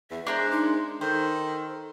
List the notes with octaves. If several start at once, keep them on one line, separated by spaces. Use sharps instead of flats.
E2 E5
G#3 D4 A#4 C5
D#4
D#3 A4 C5